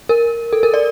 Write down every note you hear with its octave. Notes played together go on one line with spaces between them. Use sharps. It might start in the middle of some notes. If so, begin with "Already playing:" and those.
A#4
A4
A#4
D5